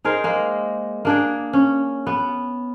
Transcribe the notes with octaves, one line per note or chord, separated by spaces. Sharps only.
D#4 G#4 A#4 C5
G#3 A#3
A#3 D4 G#4
C#4
B3